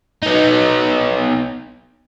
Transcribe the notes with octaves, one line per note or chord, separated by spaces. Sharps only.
B3 D#4